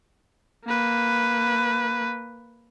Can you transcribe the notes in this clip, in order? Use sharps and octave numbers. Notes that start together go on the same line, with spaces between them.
A#3 B4